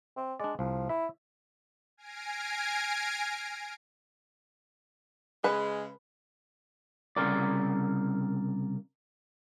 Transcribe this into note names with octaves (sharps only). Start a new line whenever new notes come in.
C4
G#3 D4 D5
C2 F3
E4 E5
G#5 F6 G#6 A#6 C7 D7
C#3 G#3 B4
C2 C#3 A#4 D5